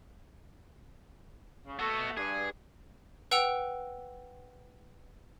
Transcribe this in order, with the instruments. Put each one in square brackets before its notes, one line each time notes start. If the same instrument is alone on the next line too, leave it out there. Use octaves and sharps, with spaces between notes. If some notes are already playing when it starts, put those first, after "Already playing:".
[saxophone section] C#3
[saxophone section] A3 [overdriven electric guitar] B3 F#4
[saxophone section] G2 [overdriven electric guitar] G#4
[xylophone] B4 F#5 G5 E6 D7 F7